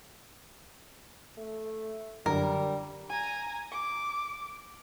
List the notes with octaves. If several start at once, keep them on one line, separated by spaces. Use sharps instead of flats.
A3
F#2 D3 G3 A#4
G#5 A#5
D6